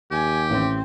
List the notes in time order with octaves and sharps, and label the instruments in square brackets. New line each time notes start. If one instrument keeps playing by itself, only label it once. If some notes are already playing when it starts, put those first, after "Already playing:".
[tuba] D#2 [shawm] G4 [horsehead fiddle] G#5
[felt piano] A1 [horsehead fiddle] C4